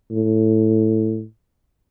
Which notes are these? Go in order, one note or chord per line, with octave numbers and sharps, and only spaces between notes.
A2